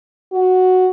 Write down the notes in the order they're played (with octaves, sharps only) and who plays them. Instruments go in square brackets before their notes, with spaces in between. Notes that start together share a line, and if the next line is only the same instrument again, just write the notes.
[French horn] F#4